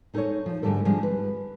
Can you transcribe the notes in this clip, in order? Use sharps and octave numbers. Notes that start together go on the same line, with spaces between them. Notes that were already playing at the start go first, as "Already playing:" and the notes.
G#3 D#4 A4 A#4 C5 C#5
F3
G#2 D3 G3 A3 A4 A#4
D3 F3 G3 G#3 C4 D#4
B4